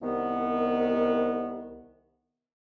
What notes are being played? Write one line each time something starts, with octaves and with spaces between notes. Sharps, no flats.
C2 D#3 B3